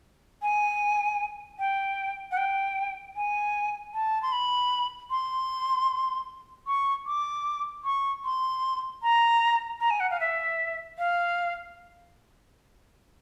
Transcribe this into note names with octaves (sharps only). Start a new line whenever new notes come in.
G#5
G5
F#5
G5
G#5
A5
C6
B5
C6
C#6
D6
C#6
C6
A#5
A#5
G#5
F#5
F5
E5
F5